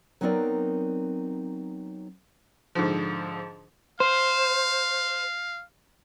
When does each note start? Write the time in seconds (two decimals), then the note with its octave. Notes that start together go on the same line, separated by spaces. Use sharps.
0.21 F#3 B3 C4 D#4 A#4 D5
2.75 G#2 D3 F3
4.00 C5 F5